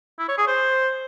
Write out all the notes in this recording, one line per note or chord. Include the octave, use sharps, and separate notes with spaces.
E4
C#5
G#4
C5